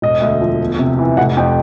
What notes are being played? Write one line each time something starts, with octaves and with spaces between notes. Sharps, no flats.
E1 D#5
D2
F3
E2
C3
E3
F1 F#5
F2 G5